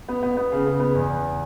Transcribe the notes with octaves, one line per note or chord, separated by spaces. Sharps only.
B3
B3
B3
C#3
C#3
B3
E2
E2